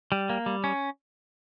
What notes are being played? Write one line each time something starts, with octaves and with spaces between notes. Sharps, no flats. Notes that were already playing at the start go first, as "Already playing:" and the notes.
G3
A#3
G3
C#4